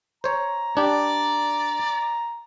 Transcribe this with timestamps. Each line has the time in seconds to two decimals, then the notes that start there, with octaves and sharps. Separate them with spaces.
0.24 C5 C#5 A#5
0.77 D4 G4 D5